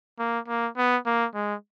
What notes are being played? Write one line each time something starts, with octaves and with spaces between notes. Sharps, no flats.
A#3
A#3
B3
A#3
G#3